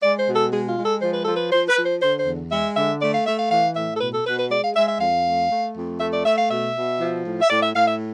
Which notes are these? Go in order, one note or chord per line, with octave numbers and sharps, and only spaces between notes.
G#3 D5
C5
B2
A4
G#3 G#4
F4
G#3
A4
F3 C5
B4
F3 A4
B4
F3 C5
B4
F3
C5
D3 C5
C5
E2
G#3 E5
D3 E5
A3 D5
F5
A3 E5
F5
E3 F5
A2 E5
A4
B2 B4
A4
B2 B4
B4
G#3 D5
F5
G#3 E5
E5
F2 F5
A3
A3
F2
A3 E5
D5
A3 E5
F5
B2 E5
B2
F3
A2
E5
A2 D5
E5
A2 F5
E5